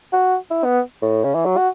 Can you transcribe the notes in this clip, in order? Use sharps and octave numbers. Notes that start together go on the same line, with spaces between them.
F#4
E4
B3
A2
C#3
E3
F#3
F#4